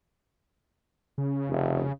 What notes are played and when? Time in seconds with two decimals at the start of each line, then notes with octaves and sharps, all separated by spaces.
1.18 C#3
1.50 F1